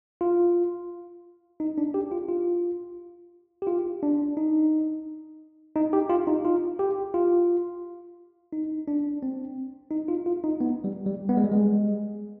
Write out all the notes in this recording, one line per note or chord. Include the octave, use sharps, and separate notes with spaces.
F4
D#4
D4
G4
F4
F4
G4
F4
D4
D#4
D#4
G4
F4
D#4
F4
G4
F4
D#4
D4
C4
D#4
F4
F4
D#4
B3
G3
G3
B3
G#3
G3
G#3